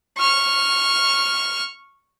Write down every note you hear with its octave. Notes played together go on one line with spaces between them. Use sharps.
C#6 F6